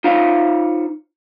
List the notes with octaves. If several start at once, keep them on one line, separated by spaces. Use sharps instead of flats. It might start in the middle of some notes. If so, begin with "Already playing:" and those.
D#4 F4 C5 C#5 F5